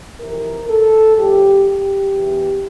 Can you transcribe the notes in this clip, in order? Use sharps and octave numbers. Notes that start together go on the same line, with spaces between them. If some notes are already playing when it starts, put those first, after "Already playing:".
F2 C3 E3 A#4
A4
A2 F3 G4
G4
E2 E3